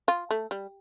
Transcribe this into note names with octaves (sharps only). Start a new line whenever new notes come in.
F4
A3
G3